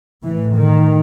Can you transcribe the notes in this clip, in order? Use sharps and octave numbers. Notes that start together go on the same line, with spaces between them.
A2 E3
D#3